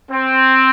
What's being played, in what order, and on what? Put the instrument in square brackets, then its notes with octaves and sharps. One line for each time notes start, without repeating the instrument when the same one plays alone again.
[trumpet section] C4